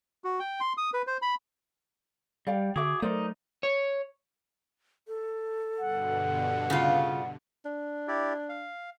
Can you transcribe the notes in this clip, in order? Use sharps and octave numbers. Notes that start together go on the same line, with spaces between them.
F#4
G5
C6
D#6
B4
C5
B5
G3 D5 F5 G5
D3 F#4 G#4 E5 D6
F#3 A3 D#4 A#4 C5 D5
C#5
A4
G2 B2 D3 F#5
C#3 F4
D4
E4 G4 D5
F5